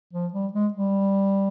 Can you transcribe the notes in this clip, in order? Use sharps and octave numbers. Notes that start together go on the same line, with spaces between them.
F3
G3
G#3
G3